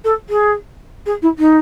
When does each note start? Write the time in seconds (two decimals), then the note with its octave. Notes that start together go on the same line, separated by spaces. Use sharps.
0.04 A4
0.29 G#4
1.06 G#4
1.22 E4
1.38 D#4